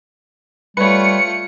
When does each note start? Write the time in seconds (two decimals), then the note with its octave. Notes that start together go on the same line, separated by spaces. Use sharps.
0.77 G3 A3 F4 B4 C#5 C#7